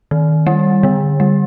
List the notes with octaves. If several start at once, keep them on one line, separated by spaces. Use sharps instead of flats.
D#3
G3
D3
G3